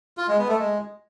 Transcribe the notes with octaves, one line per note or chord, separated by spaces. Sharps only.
F4
G#3
B3
A3
G#3